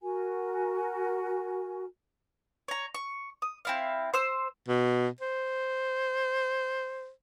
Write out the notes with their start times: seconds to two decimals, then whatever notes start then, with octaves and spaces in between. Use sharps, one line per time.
0.01 F#4 A#4 G#5
2.68 C#5 A#5
2.95 C#6
3.42 D#6
3.65 C4 E4 F5
4.14 C5 E6
4.68 B2
5.21 C5